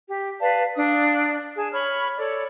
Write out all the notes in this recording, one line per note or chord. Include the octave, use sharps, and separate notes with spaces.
G4
B4 D5 F5 A5
D4 D5 F5 D#6
G#4 A5
C#5 B5 C#6 F6
A4 C#5 D5